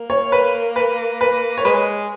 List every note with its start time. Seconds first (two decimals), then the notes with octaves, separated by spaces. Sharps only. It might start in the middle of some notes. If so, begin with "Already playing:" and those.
Already playing: A#3
0.10 C#5
0.32 B4
0.76 B4
1.21 B4
1.58 C#5
1.65 G#3 B4